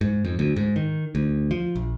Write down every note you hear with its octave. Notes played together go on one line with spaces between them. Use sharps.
G#2
F2
D2
G#2
D#3
D2
F3
A#1